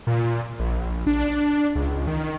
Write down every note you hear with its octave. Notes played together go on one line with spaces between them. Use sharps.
A#2
A#1
D4
C#2
D#3